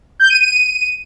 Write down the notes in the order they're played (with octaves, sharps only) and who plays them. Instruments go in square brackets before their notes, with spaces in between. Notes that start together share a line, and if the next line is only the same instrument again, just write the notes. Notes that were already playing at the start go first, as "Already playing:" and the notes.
[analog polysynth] G6
D#7
D#7